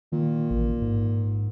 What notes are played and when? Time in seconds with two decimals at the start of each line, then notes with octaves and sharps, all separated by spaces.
0.12 A#2 D#3
0.50 A1
0.82 G#2